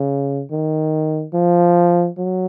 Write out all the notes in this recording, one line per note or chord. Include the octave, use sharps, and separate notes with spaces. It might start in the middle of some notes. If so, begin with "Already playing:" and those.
Already playing: C#3
D#3
F3
F#3